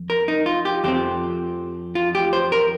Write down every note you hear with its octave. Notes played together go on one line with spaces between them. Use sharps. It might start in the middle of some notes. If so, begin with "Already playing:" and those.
Already playing: F2
A#4
D#4
F4
G4
F2 F3 C4 G4
F4
G4
C5
A#4